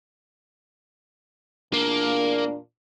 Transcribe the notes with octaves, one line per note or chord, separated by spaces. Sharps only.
E2 A#2 A#3 D4